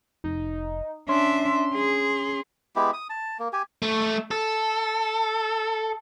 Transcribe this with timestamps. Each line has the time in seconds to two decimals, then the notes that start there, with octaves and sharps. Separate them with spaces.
0.24 F1 D#4
1.09 C#4 D4 E5 C6
1.75 G#4
2.76 G#3 B3 E4 G4
2.93 D#6
3.10 A5
3.39 A#3
3.53 G4 G#5
3.82 A3
4.31 A4